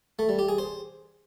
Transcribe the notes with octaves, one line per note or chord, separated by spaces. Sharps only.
A3
G3
G4
G#4
C5